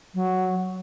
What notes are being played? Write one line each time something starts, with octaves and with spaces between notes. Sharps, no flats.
F#3